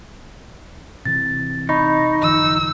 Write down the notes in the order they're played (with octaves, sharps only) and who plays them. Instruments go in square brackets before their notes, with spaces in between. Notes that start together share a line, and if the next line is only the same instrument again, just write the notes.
[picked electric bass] C3 E3 [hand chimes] A6
[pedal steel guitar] D#4 [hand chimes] D#5 B5 C#6
[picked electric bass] F#1 D#3 F3 [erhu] E6